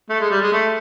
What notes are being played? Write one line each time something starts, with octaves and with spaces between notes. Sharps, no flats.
A3
G#3
G3
G#3
A3